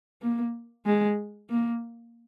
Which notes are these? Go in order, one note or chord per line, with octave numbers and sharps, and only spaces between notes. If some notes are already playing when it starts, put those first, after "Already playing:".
A#3
G#3
A#3